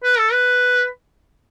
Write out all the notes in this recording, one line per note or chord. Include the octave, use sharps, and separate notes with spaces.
B4
A4
B4